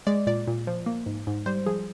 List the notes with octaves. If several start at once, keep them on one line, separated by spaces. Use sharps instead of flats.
G#3 D5
A#2 D5
A#2
F3
A#3
G#2
G#2
G3 C5
F3 G#4